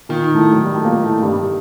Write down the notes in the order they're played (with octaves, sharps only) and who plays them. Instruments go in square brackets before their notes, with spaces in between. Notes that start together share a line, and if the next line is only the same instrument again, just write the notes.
[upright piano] A#2 [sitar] D#3
[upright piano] A2 A3
F#3
G3
A3
A#2 A#3
A2 A3
G2 G3
G3